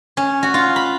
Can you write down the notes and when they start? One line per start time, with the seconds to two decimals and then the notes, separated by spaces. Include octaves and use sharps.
0.17 C#4
0.43 F#4
0.54 F4
0.76 B5